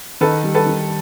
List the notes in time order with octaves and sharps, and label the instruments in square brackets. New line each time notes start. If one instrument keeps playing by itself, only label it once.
[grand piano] D#3 [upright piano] A4 B4
[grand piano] G3
[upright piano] A4 B4
[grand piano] D#3